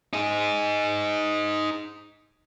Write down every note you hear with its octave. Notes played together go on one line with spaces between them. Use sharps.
D#4 G#4